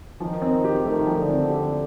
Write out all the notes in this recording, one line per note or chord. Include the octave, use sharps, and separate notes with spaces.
D#3 F3
C4
G4
D#3 A3
F3
D3
C4
G4